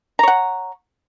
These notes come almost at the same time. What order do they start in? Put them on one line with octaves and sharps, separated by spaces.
A#5 C#5 F#5